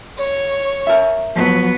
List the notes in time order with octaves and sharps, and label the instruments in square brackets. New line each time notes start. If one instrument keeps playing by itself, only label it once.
[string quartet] C#5
[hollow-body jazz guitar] A#4 E5
[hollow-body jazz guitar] F3 F#3 [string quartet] B3